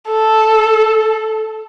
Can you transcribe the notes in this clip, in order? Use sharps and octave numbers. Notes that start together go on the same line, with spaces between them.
A4